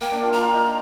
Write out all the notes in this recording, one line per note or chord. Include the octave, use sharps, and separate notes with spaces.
A#3 G5
D4
F4
F4 A#5
F4
D#4